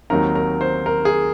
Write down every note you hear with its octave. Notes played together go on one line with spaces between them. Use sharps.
D#2 D#3 F#3 C4 D#4 A#4
A#4
C5
A#4
G#4